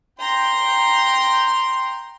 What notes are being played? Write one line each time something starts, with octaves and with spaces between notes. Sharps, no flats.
G5 A#5 C6 G6